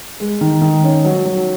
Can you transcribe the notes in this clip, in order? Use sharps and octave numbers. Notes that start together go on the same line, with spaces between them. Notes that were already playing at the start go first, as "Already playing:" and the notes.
G#3
D#3
D#3
C#4
F#3
F#3